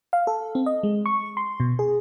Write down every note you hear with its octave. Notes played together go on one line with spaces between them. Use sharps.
F5
A4
C4
D#5
G#3
C#6
C6
B2
G#4